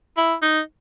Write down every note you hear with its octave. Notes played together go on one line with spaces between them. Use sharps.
E4
D#4